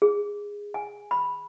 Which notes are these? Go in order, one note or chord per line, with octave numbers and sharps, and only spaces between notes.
G#4
G#5
B5